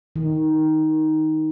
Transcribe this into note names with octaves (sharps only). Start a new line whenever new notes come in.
D#3